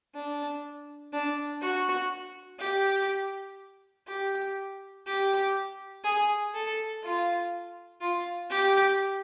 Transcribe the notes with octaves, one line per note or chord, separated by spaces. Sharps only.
D4
D4
F#4
G4
G4
G4
G#4
A4
F4
F4
G4